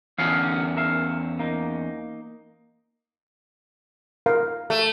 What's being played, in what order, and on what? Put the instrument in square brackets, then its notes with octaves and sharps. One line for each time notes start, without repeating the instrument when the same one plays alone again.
[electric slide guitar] E2 C#4 [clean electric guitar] D3 F5
[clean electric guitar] A#4 E5 F5
A#3 D#4
[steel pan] A#4 F5
[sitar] A3